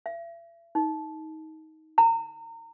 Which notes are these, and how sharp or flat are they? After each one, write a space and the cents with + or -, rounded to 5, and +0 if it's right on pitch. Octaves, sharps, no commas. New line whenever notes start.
E5 +40
D#4 +20
A#5 -30